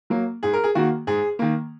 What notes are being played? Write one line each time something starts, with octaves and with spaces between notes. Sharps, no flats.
F#3 A#3
G#2 G#4
A#4
G#4
D#3 A#3 F#4
G#2 G#4
D#3 A#3